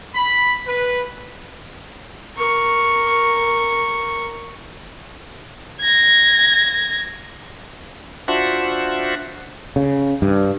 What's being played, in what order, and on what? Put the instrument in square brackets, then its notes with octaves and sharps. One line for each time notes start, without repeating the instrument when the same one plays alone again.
[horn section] B5
B4
[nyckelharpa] A#4 C#6
[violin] G#6 A#6
[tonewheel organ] D4 F4 F#4 C5 E5 F#5
[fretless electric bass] C#3
G2